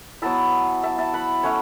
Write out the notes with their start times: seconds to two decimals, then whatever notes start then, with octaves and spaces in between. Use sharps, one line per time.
0.22 F#3 B3 E4 E5 A5
0.83 E5 A5
0.98 E5 A5
1.13 F#5 B5
1.43 A3 C#4 E4 C#5 F#5